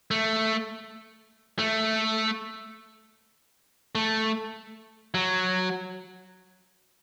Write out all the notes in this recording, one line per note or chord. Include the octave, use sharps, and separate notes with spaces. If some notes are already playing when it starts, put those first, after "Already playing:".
A3
A3
A3
F#3